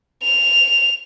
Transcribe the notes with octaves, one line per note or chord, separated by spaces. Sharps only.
F7